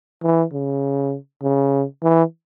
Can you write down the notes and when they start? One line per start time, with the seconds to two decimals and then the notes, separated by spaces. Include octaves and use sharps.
0.23 E3
0.53 C#3
1.42 C#3
2.02 E3